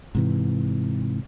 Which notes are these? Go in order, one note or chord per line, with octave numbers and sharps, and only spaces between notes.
G#2 C3 E3